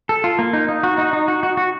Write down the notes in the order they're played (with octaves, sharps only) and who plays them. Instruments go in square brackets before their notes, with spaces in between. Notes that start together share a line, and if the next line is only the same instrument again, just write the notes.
[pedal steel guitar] A4
F4
A#3
D#4
D#4
F#4
D#4
D#4
F#4
F#4
F#4